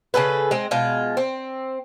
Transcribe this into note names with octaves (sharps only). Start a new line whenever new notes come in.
C#3 G#4 A4 B4
G#3 C4
B2 G#3 F4
C4